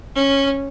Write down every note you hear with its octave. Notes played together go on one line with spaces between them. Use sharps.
C#4